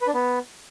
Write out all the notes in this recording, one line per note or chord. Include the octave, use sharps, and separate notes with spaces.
B4
D4
B3